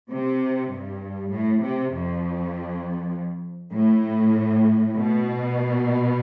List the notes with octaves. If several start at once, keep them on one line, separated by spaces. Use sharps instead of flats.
C3
G2
A2
C3
F2
A2
B2